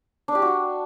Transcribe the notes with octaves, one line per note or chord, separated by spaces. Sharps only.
D4
G4
F#4